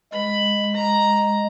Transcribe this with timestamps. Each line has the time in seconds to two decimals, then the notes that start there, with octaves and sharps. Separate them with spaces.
0.13 G#3 B5
0.75 A#5